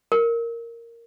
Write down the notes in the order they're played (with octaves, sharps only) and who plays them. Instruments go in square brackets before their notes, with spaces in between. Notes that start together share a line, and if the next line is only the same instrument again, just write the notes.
[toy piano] A#4